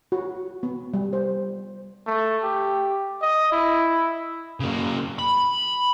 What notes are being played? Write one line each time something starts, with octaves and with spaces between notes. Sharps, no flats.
F#4
B3
G3
C5
A3
G4
D#5
E4
C#3 A#3
B5